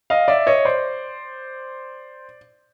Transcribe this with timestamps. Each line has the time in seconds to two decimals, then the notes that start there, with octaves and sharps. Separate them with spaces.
0.10 D#5 F5
0.28 D5 E5
0.47 C#5 D#5
0.65 C5 D5